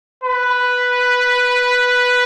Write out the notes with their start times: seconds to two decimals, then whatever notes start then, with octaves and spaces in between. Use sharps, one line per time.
0.24 B4